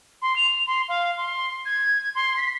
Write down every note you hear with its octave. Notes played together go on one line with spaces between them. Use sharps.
C6
F7
C6
F5
C6
G#6
C6
B6